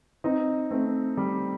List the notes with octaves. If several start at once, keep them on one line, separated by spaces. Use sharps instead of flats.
C4 D#4
A3 C4
G3